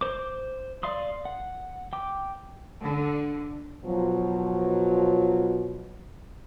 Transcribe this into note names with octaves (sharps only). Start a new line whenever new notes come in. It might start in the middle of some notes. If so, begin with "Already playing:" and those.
C5 D6
D5 F5 C6 D#6
F#5
G5 D6
D3
B2 F3 F#3